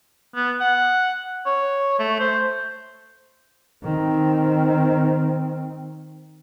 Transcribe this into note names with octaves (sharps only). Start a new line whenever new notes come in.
B3
F#5
C#5
A3
C5
D#3 C4